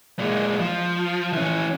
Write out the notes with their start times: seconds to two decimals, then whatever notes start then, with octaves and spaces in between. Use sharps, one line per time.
0.19 A#2 G#3
0.59 F3
1.33 E3 C#4